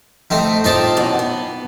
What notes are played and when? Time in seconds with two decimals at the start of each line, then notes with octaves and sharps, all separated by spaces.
0.30 A3 C4 D#4
0.64 G2 C4 D#4 F4 D5 A5
0.97 F#2 B2 E3
1.19 B3